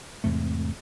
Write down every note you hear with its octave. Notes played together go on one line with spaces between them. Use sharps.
E2 G#2 C3 A3